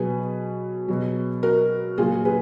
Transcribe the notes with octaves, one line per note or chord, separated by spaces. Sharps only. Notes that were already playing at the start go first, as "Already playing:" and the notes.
Already playing: B2 F#3 G#4 B4
B2 F#3
F#4 A#4
A#2 F#3 F4 G#4
G#4 B4